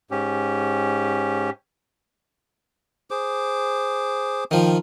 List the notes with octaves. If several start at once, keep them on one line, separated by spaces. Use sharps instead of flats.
G#2 C#4 G4
G#4 C5 D6
D#3 F3 G5